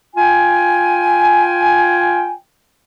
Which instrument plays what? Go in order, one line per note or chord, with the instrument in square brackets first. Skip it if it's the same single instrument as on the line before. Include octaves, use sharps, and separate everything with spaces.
[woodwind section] F4 G5 G#5